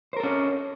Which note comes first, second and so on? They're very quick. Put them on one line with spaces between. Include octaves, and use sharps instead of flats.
C5 A#4 A4 C#4